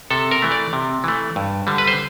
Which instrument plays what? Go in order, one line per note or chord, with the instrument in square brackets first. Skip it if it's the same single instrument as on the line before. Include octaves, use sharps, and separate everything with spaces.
[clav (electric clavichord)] C3 A4
A#4
E3 A3
D5
C3
E3 A3
G2
D3 G3
B4
C5